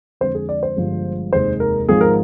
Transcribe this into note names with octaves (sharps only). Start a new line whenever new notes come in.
F2 D3 G#3 C5
G#4
D5
C5
G1 G2 F3 G#3
F1 D#2 D#3 G#3 C5
A#4
G#1 G#2 F3 G#3 G#4
A#4